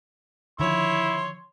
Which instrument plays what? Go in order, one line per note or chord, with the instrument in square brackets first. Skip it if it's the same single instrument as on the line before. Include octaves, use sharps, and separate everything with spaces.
[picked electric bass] D3 D#3 F3 [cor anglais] E4 [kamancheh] C#5 [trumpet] C6